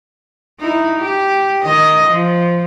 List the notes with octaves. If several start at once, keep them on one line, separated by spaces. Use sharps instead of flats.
D#4 E4
G4
D#3 D#5
F3